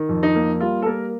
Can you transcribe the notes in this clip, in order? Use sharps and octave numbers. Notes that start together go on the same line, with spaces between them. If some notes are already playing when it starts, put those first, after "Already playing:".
Already playing: D#3
F2
D#4
A#3
G3 F4
A4
A#3 A#4